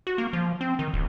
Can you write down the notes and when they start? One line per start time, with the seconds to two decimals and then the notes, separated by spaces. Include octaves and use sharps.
0.07 F#4
0.18 A#3
0.33 F3
0.61 C4
0.79 D#3
0.94 D1